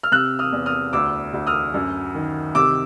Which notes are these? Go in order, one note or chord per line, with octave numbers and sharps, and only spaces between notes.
F6
C3 E6 F#6
D#6 F6
E2
D#6 F6
D2 D6 E6
D2
D#6 F6
F#2
D#3
C3 D6 E6